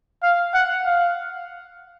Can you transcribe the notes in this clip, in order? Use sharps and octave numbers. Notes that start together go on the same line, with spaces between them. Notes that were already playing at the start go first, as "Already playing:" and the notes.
F5
F#5
F5